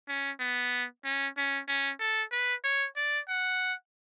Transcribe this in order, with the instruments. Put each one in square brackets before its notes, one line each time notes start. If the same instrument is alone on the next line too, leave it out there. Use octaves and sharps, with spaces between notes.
[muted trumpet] C#4
B3
C#4
C#4
C#4
A4
B4
C#5
D5
F#5